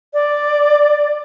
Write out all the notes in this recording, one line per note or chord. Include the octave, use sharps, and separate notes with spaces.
D5